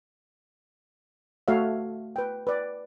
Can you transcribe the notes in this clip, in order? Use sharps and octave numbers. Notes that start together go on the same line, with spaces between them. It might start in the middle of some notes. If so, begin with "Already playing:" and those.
A3 F#4 A4 C#5 E5 F5
B4 G5
B4 D5